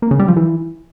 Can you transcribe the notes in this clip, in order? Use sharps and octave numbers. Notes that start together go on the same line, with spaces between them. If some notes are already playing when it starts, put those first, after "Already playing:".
A#3
C#3
G3
F3
E3